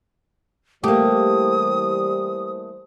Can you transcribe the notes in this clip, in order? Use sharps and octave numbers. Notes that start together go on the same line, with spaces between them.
E3 G3 A3 A#3 G4 C5 D#6